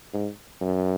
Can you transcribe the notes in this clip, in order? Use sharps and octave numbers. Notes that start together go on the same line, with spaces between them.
G#2
F#2